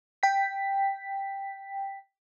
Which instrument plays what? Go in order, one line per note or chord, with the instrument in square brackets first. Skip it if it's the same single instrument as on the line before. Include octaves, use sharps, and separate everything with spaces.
[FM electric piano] G5 B6